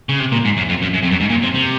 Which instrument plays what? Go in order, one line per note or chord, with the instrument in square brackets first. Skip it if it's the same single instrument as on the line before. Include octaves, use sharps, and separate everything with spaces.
[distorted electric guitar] C#3
C3
A#2
G#2
F#2
F2
F#2
F#2
F2
F#2
G#2
A#2
C3
C3